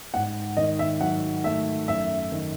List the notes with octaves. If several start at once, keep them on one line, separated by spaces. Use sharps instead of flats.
G#2 F#5
D#3 D#5
E5
F#3 F#5
A3 E5
F#2 E5
D#3